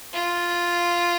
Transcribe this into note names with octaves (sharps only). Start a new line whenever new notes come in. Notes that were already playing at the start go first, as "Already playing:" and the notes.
F4